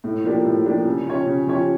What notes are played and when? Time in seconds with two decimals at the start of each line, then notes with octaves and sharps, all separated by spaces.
0.04 A2
0.24 F3 A#3 D4 G4
0.45 A2
0.65 F3 A#3 D4 G4
0.85 C#3
1.06 F3 C#4 G4 C#5
1.26 C#3
1.47 F3 C#4 G4 C#5